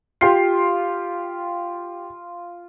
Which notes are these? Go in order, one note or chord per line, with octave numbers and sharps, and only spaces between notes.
F4 G4 G5 C7